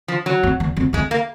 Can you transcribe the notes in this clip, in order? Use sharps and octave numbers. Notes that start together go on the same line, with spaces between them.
F3
F#3
F2
E2
F2
F2 G#3
A#3